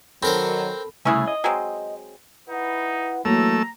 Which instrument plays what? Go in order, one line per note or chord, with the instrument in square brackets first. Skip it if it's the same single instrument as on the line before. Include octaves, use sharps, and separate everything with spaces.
[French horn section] D#3 F#3 [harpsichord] C4 A#4 C5 [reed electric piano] A4 B5
[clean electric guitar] C2 C#3 A3 [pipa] C#4 E4 G#4
[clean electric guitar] D#5
[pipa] F#3 G#3 C4
[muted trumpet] D#4 [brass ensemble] E4 B4 F#5
[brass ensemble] E3 F#3 [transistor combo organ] A3 E6 [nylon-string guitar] A#3 [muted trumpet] A#5